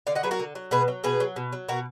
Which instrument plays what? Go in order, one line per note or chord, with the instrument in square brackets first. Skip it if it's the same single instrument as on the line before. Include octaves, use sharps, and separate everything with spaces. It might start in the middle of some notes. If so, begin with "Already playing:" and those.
[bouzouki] D3 D5 F5
D#5 F#5
F#3 G#4 B4
F#4 A#4
D3
F#3
B2 G#4 B4
F#3
B2 G#4 B4
F#3
B2
F#3
B2 F#4 A#4